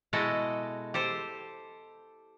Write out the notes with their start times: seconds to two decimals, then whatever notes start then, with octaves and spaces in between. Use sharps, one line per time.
0.13 B2 G#3 E4 F#4 A4 D#5
0.94 G4 A4 C5